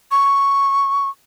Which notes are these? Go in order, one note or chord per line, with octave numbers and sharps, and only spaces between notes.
C#6